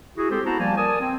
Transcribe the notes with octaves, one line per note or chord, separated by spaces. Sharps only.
E4 F#4 G#4
G#3 C4 G4 A4 C5
B3 E4 F#4 C5 A5 A#5
F3 G3 A#3 G#5 A5
A#4 D5 G#5 A5 D#6
C4